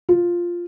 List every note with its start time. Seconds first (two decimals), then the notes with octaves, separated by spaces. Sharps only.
0.09 F4